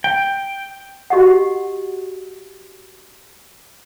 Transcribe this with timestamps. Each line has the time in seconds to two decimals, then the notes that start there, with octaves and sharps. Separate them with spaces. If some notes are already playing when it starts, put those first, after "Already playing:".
0.04 G5
1.10 F#4 G4 D#5 F#5